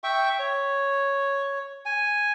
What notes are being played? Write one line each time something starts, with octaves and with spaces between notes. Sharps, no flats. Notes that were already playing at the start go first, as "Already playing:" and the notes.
E5 G5 C#6
C#5
G#5